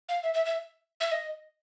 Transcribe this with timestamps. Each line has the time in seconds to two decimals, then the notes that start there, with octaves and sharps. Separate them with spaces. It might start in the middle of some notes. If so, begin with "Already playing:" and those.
0.09 F5
0.23 E5
0.34 E5
0.46 E5
1.00 E5
1.12 D#5